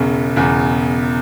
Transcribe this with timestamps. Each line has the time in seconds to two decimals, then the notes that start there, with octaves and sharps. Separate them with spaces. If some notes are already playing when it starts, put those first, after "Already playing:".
Already playing: E1 E2 C#3
0.36 E1 E2 C#3